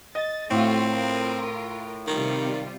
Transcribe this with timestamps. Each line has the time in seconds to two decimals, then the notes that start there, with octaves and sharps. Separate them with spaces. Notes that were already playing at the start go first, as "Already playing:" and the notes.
0.15 D#5 A6
0.51 A2 A3 C4 F4 F#4
0.91 F4 A#4
2.07 C3 D#3 G3 F4